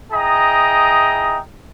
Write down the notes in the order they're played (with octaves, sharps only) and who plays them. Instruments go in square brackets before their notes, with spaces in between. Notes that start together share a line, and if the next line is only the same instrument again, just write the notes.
[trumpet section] E4 G#4 D#5 G5 A#5 D#6